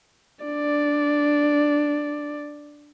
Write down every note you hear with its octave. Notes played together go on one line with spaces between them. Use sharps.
D4 D5